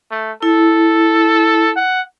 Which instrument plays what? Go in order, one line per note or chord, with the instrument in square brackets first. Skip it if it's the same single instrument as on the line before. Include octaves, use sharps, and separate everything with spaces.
[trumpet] A3
[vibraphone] E4 [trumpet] A4
[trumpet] F#5